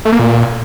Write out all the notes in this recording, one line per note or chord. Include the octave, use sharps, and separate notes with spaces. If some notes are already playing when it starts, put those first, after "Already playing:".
A3
A#3
A#2